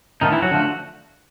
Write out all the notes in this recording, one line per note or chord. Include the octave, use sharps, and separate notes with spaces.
D3 D#3 F3 A3 D#4
E3 E4
F#3 F#4
D3 F3 A3